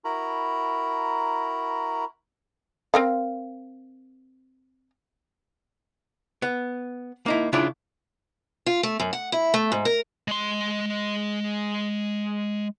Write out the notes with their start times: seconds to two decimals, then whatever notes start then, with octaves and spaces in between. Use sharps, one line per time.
0.05 E4 F#4 A#4 A#5 B5
2.94 C4 A#4 F5
6.42 B3
7.26 A#3 D#4 E4
7.53 C#3 D4 E4 F4 D5
8.66 F4
8.83 A3
9.00 F#2
9.13 F#5
9.32 E4
9.54 A3
9.72 G#2
9.85 A#4
10.28 G#3 C6